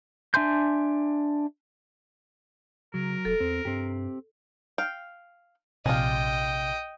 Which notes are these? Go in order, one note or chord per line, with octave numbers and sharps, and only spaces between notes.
D4 E5 G#5 C6 G6
C#3 F#3 A#4
E1 A4
E2 C4
G2 C4 G4
F5 G5
A#1 C3 G#3 D4 F4 D#5 G5